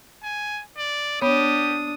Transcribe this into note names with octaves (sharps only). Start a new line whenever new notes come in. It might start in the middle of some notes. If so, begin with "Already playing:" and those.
G#5
D5
B3 D4 G4 C#5 D#6